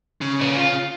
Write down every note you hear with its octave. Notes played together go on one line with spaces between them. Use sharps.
C#3
A#2 B4 C#5
F4